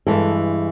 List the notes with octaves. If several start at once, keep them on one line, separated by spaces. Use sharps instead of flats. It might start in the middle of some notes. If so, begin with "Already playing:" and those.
G2 E3 G#3 A4